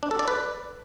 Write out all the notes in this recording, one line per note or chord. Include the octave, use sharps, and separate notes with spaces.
D4
A4
D5
B4